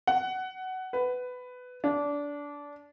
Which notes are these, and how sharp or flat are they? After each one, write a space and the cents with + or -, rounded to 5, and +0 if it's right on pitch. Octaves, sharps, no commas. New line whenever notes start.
F#5 +15
B4 +15
D4 -20